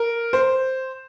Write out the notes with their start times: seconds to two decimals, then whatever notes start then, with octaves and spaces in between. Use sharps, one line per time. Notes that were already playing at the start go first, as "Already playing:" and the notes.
Already playing: A#4
0.33 C5